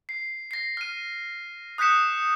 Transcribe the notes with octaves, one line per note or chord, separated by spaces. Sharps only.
C7
A#6 C7
F6 D#7
D#6 F#6 G6 B6 C#7 E7